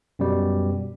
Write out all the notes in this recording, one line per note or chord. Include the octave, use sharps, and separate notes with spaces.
F#2 B2 G3